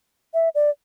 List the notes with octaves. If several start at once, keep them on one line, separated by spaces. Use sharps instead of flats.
E5
D5